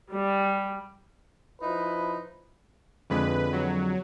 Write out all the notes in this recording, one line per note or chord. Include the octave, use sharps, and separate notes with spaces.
G3
F3 D#4 E4 B4
F2 D3 G#3 B4
F#3